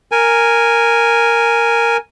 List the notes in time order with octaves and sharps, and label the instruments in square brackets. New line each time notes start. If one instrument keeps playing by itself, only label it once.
[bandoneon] A#4 G#5